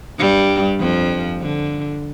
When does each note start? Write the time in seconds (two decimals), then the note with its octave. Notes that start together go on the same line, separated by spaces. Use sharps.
0.19 G2 G3
0.80 F2 F3
1.41 D3